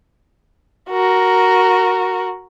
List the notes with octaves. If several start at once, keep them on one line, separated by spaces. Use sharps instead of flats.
F#4 A#4